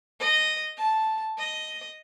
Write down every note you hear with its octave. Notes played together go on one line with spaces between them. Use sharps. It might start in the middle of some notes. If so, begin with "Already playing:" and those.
D#5
A5
D#5